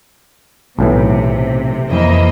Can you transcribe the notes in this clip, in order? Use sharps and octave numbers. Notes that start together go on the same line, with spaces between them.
B1 A2 C3 E3
F2 E3 A#3 D#5 E5